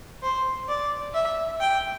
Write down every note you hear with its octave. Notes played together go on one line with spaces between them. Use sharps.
C5
D5
E5
G5